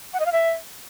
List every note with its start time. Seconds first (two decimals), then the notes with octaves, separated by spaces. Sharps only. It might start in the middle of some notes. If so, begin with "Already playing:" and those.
0.14 F#5
0.20 D#5
0.26 F5
0.32 E5